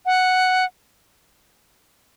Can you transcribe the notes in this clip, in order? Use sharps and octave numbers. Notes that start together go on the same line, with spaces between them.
F#5